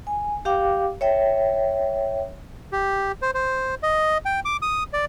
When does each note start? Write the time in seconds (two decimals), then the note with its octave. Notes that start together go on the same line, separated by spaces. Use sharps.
0.07 G#5
0.45 G4 F5 G5 D6
1.01 C#5 E5 G5
2.72 G4
3.22 C5
3.34 C5
3.83 D#5
4.25 G5
4.45 D6
4.62 D#6
4.93 D5